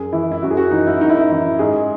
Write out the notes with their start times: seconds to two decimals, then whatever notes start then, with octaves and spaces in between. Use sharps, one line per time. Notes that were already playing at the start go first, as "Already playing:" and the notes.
Already playing: F#2 G#4
0.13 E3 E4
0.32 E4
0.42 F#2 F#4
0.51 G#4
0.57 F#4
0.71 E3 D#4
0.87 E4
1.01 F#2 D#4
1.09 E4
1.17 D#4
1.30 E3 E4
1.59 G#2 G#4